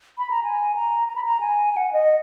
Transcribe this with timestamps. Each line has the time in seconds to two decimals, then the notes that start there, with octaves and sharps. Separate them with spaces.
0.18 B5
0.30 A#5
0.44 G#5
0.75 A#5
1.08 A#5
1.16 B5
1.25 A#5
1.40 G#5
1.72 G#5
1.77 F#5
1.93 D#5